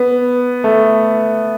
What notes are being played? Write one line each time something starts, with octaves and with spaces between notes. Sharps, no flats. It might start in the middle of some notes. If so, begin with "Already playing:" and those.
Already playing: B3
A3